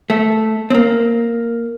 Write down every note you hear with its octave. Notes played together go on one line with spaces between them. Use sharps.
A3
C4
A#3